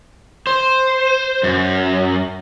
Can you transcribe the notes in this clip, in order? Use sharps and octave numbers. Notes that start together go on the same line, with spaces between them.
C5
F#2